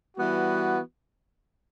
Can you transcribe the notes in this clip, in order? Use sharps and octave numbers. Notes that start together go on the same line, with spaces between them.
E3 G3 B3 F#4